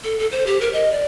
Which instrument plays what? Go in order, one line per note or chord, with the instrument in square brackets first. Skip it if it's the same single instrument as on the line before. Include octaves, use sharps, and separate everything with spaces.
[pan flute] A4
A4
C5
G4
A#4
D#5
D5